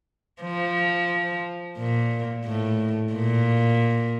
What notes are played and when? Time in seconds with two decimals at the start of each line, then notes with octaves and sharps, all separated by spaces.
0.42 F3
1.78 A#2
2.45 A2
3.12 A#2